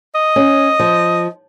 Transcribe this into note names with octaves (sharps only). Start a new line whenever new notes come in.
D#5
C#4
F3